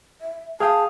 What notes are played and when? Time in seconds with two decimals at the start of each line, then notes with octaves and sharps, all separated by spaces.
0.21 E5
0.60 G#4 F5 G5 A5 D#6